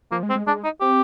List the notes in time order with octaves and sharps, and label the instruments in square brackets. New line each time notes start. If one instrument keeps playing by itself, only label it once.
[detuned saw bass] F3 [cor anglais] A#3
[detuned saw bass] G#3
[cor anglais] C4
[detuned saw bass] G#3
[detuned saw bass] G#3 [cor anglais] D4
[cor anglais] D#4
[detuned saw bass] C4 [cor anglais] G4